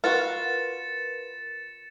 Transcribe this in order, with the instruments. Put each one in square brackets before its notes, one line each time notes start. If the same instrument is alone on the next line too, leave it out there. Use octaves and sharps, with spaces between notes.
[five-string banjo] F4 F#4 [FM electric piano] A#4 B4 [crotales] A6 C#7 E7